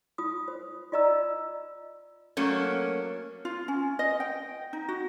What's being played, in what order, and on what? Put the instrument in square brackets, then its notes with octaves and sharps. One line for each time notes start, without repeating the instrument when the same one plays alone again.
[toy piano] F4 D#6
C5
F4 D5 D#5 A#5 E6
[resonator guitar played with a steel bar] F#3 A3 A#3 C#4
[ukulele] F4
C#4
D#5
G5
D#4
F#4